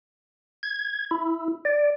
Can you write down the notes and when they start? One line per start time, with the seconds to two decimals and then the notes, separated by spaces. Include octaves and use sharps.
0.63 G#6
1.11 E4
1.65 D5